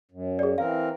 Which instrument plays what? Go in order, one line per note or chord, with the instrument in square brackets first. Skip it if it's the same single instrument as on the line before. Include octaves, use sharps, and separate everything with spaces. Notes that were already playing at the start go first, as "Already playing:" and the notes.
[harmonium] F#2
[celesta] G#4 D5
[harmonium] E3 C4 A#4 [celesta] F5